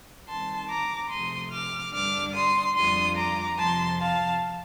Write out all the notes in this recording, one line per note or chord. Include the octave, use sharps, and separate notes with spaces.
D#3 G3 C4 A5 C6
A#5 D6
C3 F3 A3 C6 D#6
D6 F6
G2 D3 G3 D4 D6 F6
C6 D#6
F2 D3 G3 D4 F4 C6 D#6
A#5 D6
F2 C3 F3 A5 C6
F5 A5